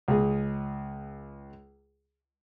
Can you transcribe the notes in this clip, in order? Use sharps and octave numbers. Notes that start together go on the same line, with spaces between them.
C#2 G#4